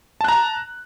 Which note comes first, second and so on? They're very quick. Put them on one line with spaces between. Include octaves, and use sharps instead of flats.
A5 F#6 A#5